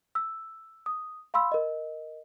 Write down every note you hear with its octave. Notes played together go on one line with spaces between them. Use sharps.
E6
D#6
F5 B5 C6 E6
A#4 D#5